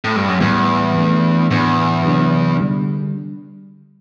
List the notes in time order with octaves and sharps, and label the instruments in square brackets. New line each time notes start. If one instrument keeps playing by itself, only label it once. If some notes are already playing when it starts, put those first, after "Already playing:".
[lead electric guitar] A2
G2
F#2
[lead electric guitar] E2 [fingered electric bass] A2 E3 G3
[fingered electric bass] E3 A3 D4
[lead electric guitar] E2 [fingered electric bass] A2 E3 B3 D4
[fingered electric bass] C3 F#3 B3 D4
D3 G3 D4